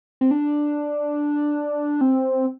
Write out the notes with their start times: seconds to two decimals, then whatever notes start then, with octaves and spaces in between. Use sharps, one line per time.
0.21 C4
0.31 D4
2.01 C4